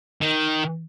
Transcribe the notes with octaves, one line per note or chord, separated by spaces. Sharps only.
D#3